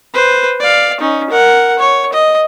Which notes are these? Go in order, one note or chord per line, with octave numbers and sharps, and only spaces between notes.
B4 C5
D5 F5
C#4 D#4
A#4 F#5
C#5
D#5